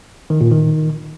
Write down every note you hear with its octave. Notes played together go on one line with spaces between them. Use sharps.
D#3
A#2
D#3